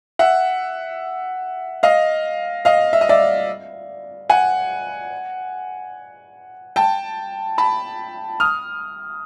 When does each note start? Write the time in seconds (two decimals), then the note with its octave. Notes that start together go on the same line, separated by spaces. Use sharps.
0.19 E5 F#5
1.83 D#5 F5
2.65 D#5 F5
2.93 E5
3.01 D#5
3.09 D5 E5
4.30 F#5 G#5
6.76 G5 A5
7.58 A5 B5
8.40 D#6 F6